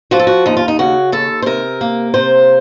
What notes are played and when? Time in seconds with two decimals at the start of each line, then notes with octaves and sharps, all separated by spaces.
0.11 F3 F#4
0.19 A4
0.27 F#4
0.46 D#2 D#4
0.57 F4
0.68 D#4
0.79 C#3 F#4
1.12 D#2 A4
1.42 C5
1.46 C3 A#4
1.81 A#3
2.14 C3 C5